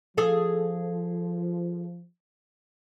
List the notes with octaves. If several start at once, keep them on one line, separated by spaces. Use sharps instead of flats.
F3 G#4 A4 F5